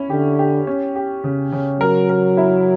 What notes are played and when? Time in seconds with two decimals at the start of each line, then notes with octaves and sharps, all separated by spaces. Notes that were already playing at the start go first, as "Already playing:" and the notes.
Already playing: C#4 E4
0.10 D3 G4
0.39 G4
0.67 C#4
0.95 G4
1.24 C#3
1.52 C#3
1.80 F#3 A#4
2.10 A#4
2.37 E4